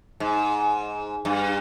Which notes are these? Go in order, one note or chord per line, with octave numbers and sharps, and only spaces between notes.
G#2
G2